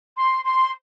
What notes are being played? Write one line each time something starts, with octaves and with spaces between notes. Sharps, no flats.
C6
C6